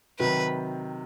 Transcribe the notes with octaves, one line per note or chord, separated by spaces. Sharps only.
C3 D#3 F#3 B4